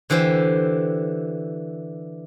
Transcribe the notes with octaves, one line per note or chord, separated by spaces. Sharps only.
D3 E3 G4 C5